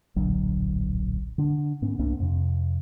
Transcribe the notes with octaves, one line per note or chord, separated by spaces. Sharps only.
D1 A#1 D3 F#3
D3 D4
G#2 B3 C#4
C2 A#3 C4 D4
F2 C3